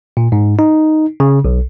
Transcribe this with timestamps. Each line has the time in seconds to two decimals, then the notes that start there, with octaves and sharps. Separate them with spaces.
0.17 A#2
0.32 G#2
0.59 D#4
1.20 C#3
1.45 B1